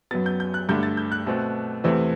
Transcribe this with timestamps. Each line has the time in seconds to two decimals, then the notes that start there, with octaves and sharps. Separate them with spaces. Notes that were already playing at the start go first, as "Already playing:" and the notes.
0.11 F#2 F#3 B3 A6
0.26 G6
0.40 G6
0.54 F#6
0.69 G2 D3 A3 G6
0.83 A6
0.97 G6
1.12 F#6
1.26 B2 A3 C4
1.84 E2 C3 E3 A3 C4